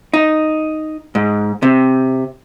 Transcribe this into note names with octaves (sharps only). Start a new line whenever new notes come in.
D#4
G#2
C3